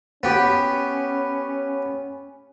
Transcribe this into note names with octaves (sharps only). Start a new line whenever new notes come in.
B3 C#4 G4